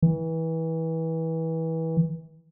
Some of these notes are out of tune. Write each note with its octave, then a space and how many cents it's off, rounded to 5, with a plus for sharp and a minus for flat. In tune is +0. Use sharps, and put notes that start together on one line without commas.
E3 -25